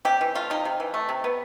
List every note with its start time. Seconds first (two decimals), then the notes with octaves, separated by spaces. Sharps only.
0.05 C3 G4
0.21 E3
0.35 A3 F4
0.50 C3 D#4
0.65 C3
0.80 E3
0.94 A3
1.09 C3
1.24 B3